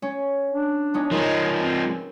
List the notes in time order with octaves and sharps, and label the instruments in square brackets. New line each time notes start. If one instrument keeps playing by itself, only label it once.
[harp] C#4
[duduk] D4
[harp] B3 C#4 D#4
[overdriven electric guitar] F3 G#3 [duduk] D#4 [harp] A#4 B4
[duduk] C4